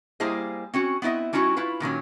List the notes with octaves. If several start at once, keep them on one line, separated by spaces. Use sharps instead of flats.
G3 A#3 E4 G#4 C5 D#5
C4 C#4 F#4
B3 C4 E4 D#5 E5
G3 C#4 D#4 E4 F#4
E4 F4 B4
A#2 D#3 F#3 C#4